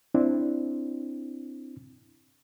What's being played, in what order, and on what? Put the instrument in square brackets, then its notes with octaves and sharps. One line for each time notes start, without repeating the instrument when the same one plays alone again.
[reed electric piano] C4 D4 E4